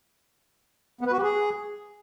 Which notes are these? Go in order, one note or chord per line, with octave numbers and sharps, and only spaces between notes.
B3
B4
F#4
G4
G#4